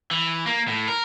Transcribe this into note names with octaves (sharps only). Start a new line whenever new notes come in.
E3
A#3
A2
A#4